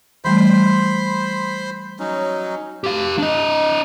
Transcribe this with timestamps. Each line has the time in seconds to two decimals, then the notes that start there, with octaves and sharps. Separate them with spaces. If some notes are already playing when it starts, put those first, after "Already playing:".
0.25 E3 G3 A3 C5 B5 C6
1.99 F#3 C#4 D#4
2.84 G4 F5
3.18 D4 D#5